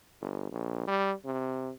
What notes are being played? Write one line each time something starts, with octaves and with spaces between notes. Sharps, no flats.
G1
A#1
G3
C3